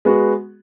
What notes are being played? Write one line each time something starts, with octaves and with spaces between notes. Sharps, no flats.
G#3 B3 F#4